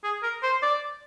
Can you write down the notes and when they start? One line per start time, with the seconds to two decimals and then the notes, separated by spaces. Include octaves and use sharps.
0.04 G#4
0.23 A#4
0.43 C5
0.62 D5